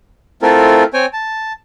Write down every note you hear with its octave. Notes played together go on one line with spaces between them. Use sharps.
A3 C4 E4 F4 A4 A#4
C4 C#5 G5 G#5
A5